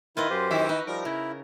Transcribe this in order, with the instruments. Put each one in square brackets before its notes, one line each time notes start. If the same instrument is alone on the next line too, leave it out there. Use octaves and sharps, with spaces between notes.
[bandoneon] D#3 E4 [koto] F4 B4 D#5
[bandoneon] F#2 G4 C5
[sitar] D#3 E4 E5 [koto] F#4
[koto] D#4 [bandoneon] B4
[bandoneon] F3 G3 [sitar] A#4
[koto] C#3 [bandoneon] E4